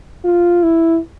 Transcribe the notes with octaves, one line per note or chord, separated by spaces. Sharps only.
F4
E4